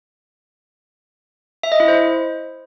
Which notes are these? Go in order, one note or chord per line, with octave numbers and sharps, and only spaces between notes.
E5
D#5
E4
C5